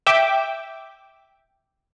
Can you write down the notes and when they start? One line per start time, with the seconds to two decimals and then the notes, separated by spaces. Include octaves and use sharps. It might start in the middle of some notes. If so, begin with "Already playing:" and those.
0.07 E5 G5 D6